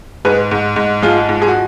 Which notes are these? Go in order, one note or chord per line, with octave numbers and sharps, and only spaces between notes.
G#2 G#4 B4
G#2
G#2
F3 F4 G#4
G#2
G#4
F#4